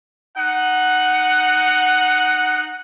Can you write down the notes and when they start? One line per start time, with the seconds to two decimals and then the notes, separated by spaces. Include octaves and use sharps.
0.37 D#4 F#5